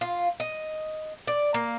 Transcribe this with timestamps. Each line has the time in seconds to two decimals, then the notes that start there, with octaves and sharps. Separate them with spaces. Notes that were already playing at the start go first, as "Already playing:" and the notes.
0.01 F4
0.40 D#5
1.27 D5
1.54 A#3